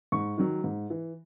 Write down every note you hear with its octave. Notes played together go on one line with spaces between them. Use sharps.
G#2 C#6
D#3 F#3
G#2
E3